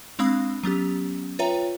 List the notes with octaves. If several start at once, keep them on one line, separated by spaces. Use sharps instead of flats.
G#3 C4 D4 F5 B5 D#6
F#3 B3 C#4 G4
F4 B4 C#5 E5 G5 A#5